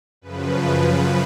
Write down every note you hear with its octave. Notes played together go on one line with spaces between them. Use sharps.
F#2 C#3 F3 B4